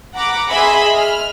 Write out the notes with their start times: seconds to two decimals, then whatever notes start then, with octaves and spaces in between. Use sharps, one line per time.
0.15 F#5 A#5 B5 D6
0.50 G#4 D#5 E5 G#5 B5 C6
0.94 F6